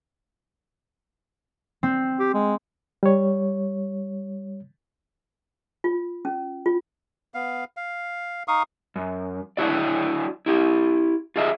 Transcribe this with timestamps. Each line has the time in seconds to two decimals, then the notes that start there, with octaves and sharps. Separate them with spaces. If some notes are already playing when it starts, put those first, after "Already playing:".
1.83 C4
2.19 G4
2.34 G#3
3.03 G3 C#5
5.84 F4
6.25 C#4
6.66 F4
7.34 B3 F5
7.77 F5
8.48 D#4 F5 C#6 D#6
8.96 F#2
9.57 F#3 D4 E4 F#4 D5
10.46 E4 G4
11.36 F4 G#4 D#5 E5